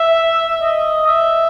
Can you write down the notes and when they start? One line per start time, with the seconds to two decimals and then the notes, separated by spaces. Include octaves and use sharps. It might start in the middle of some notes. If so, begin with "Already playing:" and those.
Already playing: E5
0.61 D#5
1.07 E5